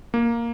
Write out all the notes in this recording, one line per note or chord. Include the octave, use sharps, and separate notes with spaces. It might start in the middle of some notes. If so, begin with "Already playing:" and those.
A#3